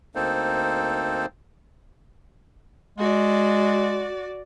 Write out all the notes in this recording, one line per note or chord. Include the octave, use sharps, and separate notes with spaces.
D2 A#3 C4 D#4 A4 C5
G#3 F#4 D5